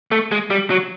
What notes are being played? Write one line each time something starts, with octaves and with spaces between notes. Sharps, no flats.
A3
G#3
G3
F#3